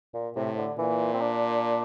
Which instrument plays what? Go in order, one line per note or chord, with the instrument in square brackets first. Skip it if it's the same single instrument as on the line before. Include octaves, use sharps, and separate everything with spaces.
[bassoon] A#2
[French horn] A2 [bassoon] C3
[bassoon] D3
[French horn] A#2 [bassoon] E3
[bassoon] C4
D4